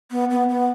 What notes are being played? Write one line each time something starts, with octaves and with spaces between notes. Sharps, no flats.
B3
B3
B3